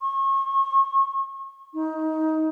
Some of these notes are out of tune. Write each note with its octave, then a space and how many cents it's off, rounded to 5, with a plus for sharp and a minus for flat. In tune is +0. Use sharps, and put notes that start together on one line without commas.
C#6 -35
D#4 +20